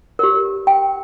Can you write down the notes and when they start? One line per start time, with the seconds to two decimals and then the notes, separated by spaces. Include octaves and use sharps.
0.19 G4 A#4
0.67 G5